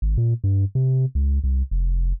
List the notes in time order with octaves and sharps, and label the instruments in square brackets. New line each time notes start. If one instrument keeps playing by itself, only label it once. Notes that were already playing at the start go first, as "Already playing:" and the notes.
[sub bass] G#1
A#2
G2
C3
C#2
C2
F1